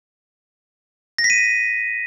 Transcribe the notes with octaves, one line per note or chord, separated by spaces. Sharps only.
A#6
B6
D#7